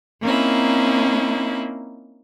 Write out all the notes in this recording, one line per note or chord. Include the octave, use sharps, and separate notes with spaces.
A#3 C4 C#4 D#4 E4